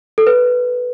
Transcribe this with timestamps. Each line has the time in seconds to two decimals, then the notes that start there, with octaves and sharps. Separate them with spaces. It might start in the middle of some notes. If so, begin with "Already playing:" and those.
0.18 A4
0.27 B4